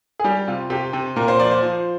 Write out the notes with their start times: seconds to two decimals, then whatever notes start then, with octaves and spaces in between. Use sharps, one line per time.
0.19 G#4
0.24 G3 G4
0.48 C3 F4
0.70 C3 G4
0.93 C3
1.16 A#2 A#4
1.28 C5
1.39 F3 D5
1.51 C5
1.62 F3